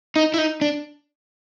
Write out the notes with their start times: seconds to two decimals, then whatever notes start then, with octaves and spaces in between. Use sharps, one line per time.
0.16 D#4
0.34 E4
0.38 D#4
0.61 D4